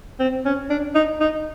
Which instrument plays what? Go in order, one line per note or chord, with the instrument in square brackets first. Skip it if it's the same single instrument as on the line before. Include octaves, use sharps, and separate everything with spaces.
[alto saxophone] C4
C#4
D4
D#4
D#4